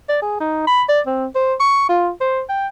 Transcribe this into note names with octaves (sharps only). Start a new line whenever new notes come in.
D5
G#4
D#4
B5
D5
C4
C5
C#6
F4
C5
G5